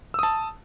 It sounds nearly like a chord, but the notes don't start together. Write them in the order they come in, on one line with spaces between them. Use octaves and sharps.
E6 D#6 A5